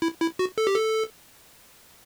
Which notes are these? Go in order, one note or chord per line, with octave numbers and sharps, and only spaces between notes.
E4
E4
F#4
A4
G4
A4